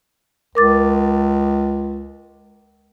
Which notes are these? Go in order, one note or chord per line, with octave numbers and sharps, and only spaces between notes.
C#2 A#4 D6 A6